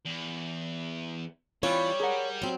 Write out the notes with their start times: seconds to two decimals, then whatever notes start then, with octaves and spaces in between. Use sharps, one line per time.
0.05 E2
1.63 E3 G3 C4 F4 C#5
2.00 G#4 A#4 F#5
2.42 F#3 C4